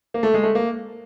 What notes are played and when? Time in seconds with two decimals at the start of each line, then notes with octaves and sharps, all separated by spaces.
0.14 A#3
0.23 A3
0.34 G#3
0.43 A3
0.55 A#3